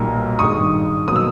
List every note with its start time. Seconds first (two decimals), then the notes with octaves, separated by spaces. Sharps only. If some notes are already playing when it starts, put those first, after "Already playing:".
Already playing: B1 A#2 G3 A#3
0.39 G#1 G2 D#3 G#3 C#6 D#6
1.08 B2 F#3 A#3 D#6
1.16 E6